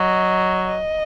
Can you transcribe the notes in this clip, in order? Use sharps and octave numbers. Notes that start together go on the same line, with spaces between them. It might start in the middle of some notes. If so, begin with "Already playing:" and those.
Already playing: F#3 D#5
D#5